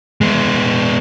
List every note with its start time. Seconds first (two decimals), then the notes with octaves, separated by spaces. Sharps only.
0.21 G#3 B3